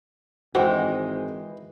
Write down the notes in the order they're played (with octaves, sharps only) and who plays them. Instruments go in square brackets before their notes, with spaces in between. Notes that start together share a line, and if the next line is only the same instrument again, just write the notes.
[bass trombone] G#1 [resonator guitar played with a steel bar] E3 G#3 [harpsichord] F#4 [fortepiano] C5 G5